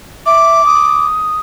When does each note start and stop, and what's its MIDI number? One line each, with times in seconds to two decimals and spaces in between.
0.26 0.64 76
0.26 1.06 86
0.66 1.40 87